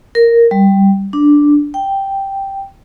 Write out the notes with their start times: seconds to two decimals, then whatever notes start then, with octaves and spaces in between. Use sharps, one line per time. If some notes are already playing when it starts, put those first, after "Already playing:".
0.15 A#4
0.51 G3
1.13 D4
1.74 G5